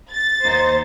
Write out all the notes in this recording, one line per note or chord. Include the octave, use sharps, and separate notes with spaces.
A6
D#2 D#4 C5